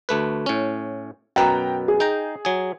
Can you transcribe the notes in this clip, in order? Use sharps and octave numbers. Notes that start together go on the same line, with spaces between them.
D2 A3 B4
A2 C#4
F#2 B2 B4 G5 A#5
G#4
D#4 G5 A#5
F#3 G#4